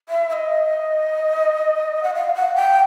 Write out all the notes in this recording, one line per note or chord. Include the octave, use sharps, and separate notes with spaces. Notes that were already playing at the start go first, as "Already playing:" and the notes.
E5
E5
D#5
F#5
F5
F#5
G5